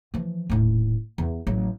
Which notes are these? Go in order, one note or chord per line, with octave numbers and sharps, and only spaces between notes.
E3 F3
D#1 A2
E2
A1 F#3